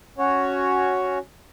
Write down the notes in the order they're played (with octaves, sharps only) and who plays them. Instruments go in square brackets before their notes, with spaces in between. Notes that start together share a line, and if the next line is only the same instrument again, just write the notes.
[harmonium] C#4 F#4 C#5